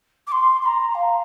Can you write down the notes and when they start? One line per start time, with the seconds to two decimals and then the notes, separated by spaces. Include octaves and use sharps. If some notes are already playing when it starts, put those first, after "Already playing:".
0.27 D6
0.32 C6
0.62 C6
0.66 A#5
0.95 F5